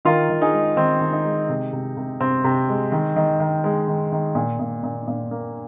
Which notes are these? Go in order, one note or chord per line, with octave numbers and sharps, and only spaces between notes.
D#3 F4 A#4
D#3
D#4 G#4
G#3
D#3 C4
D#3
D#4
G#3
C3
C3
C3
C3 C4
C3
G#3
D#3
D#3
D#3
G#3
D#3
D#3
A#2
A#2
A#2
A#2
A#3